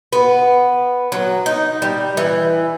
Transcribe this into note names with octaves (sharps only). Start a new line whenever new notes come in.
B3
F#3
D#4
G3
E3